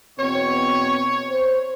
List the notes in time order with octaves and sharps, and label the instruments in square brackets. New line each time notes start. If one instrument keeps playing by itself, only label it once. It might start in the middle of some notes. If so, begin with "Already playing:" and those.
[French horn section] E2 B2 C4 [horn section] C#5
[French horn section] C5